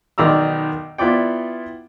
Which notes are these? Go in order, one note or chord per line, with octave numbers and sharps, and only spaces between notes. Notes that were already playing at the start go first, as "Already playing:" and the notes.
B1 D#3 D5 A#5 E6
B3 E4 F4 D5 G5